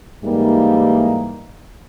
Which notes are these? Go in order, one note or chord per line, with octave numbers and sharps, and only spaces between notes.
G#2 E3 G3 A#3 D#4